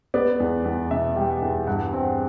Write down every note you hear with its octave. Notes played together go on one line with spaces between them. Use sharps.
B3 D5
E2
E2
B2 E5
G3 G5
E2
G2 F#5
C4